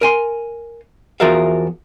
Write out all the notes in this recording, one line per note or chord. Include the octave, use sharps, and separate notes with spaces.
A#4 G#5 C6
E2 F3 F#4 A#4 E5 F5